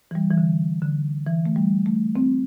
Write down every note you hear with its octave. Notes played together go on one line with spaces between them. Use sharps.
E3
G3
E3
D3
D3
E3
A3
G3
A3
C4